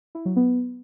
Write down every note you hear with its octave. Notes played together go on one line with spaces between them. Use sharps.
E4
F#3
B3